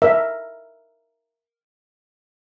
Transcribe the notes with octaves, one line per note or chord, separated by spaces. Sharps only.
A#4 E5